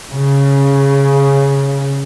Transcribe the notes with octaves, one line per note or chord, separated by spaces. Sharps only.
C#3